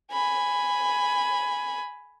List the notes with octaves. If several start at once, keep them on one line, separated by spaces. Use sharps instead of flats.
G#5 B5